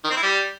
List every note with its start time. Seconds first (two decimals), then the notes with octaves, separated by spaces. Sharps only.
0.05 D#3
0.11 C4
0.17 E4
0.23 G3